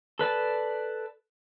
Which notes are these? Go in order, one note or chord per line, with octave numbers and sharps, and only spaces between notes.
A4 B4 D5 A5